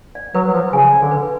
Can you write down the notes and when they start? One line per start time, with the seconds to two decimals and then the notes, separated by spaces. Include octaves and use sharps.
0.15 D5
0.35 F#3 B4
0.48 F#3
0.53 F3 B4
0.73 C#3 G#5
0.91 D5
1.01 D3
1.11 B4